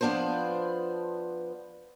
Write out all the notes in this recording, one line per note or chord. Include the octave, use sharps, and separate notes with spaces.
F3 B3 D4 B4 C5